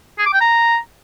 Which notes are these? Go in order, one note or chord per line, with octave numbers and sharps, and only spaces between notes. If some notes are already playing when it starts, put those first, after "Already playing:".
G#4
D6
G5
A#5